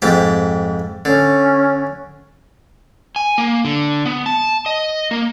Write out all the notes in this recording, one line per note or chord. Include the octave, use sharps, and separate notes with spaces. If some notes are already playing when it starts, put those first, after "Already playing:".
F2 G#2 G4
D3 C#4
G#5
A#3
D3
B3
A5
D#5
A#3